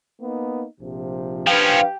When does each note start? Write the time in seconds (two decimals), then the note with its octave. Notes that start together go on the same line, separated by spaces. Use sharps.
0.20 A#3 B3 D#4
0.79 A#1 C3 F3
1.47 F3 C#4 D4 G4 B4 F5